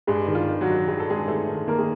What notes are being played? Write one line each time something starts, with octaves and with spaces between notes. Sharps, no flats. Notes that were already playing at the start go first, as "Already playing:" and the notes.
G2 G#3 G#4
D#3
F4
D#3
F#3 F#4
D#3
G2 G#4
A4
G2 G#3 G#4
D#3 A3 A4
D#3
D#3 A#3 A#4
G#4